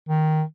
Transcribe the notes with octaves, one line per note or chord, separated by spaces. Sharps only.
D#3